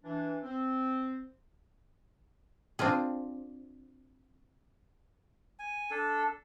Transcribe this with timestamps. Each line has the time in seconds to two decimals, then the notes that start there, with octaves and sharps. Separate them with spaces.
0.04 E3 D4
0.43 C4
2.79 C4 D4 F4 G#4
5.59 G#5
5.91 D4 A4